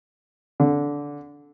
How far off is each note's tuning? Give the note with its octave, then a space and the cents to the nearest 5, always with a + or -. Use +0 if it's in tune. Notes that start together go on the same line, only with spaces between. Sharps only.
D3 -15